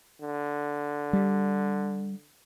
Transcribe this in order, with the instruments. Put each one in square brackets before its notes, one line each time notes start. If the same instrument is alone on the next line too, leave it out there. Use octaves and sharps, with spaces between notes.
[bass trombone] D3
[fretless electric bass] G3